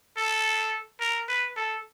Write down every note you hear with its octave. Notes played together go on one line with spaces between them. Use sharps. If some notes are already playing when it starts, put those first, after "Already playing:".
A4
A#4
B4
A4